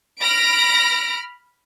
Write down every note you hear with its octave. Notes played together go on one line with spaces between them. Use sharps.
B5 F6 A#6 D7